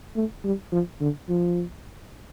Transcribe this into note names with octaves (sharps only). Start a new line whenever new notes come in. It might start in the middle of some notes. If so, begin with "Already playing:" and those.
A3
G3
F3
D3
F3